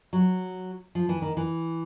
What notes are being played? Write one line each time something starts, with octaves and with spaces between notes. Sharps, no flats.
F#3
F3
E3
D#3
E3